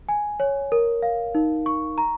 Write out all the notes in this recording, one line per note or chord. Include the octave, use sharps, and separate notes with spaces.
G#5
C#5
A#4
F5
D#4
C#6
A#5